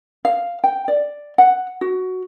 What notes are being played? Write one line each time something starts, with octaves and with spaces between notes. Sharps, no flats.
F5
G5
D5
F#5
F#4